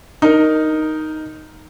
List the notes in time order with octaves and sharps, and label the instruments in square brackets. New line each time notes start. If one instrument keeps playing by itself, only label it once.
[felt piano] D#4 A#4